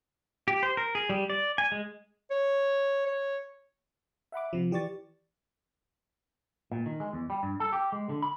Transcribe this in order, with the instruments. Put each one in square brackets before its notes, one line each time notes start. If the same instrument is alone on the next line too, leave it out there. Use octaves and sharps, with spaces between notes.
[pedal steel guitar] G4
C5
A#4
G#4
G3
D5
G#5
G#3
[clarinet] C#5
C#5
[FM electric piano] E5 F#5 B5 D6
C3 F3
E3 G4 D5 C#6 A6
[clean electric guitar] A#2
D#3
G#3
E2
G3
G2
A4
G4
G#3
D3
B5